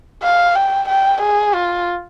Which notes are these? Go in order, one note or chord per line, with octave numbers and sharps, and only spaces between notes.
F5
G5
G5
G#4
F4